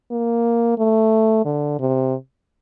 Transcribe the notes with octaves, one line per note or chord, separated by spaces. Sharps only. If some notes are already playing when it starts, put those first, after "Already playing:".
A#3
A3
D3
C3